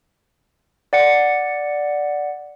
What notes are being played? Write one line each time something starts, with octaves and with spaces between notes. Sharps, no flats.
D5 F#5 C#7